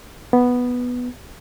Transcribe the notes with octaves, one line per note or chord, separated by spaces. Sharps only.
B3